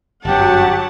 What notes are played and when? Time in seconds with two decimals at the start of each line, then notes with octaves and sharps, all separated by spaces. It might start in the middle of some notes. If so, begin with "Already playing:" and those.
0.24 G1 F#2 F#3 G4 F#5 A5